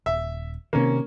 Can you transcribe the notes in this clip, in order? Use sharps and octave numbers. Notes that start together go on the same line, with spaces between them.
D#1 E5
C3 D#3 A#3 C#4